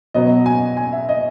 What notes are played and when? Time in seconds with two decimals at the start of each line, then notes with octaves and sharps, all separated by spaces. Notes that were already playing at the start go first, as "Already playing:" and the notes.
0.14 B2 F#3 B3 D#5
0.46 G#5
0.77 G#5
0.93 E5
1.09 D#5